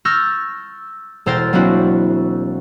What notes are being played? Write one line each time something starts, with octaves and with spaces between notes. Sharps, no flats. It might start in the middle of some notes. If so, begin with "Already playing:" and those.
C#6 E6 F6 G6 A6 A#6
E1 A4 A#4 C5 G5 A6
F#3 A#3 C4 D4 E4 F#4